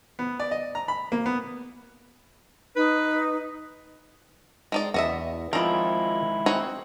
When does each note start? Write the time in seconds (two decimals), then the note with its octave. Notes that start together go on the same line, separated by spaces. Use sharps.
0.19 B3
0.40 D5
0.51 D#5
0.75 A#5
0.88 B5
1.12 A#3
1.26 B3
2.76 D#4 B4
4.72 G#3 D#4 D5
4.94 E2 F#4 D#5 E5
5.53 D#3 F3 G#3 C4 E4 A#4 D5
6.46 C4 D#4 F#4 C#5